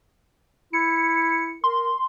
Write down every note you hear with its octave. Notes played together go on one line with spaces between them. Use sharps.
E4 C#7
A#4 C6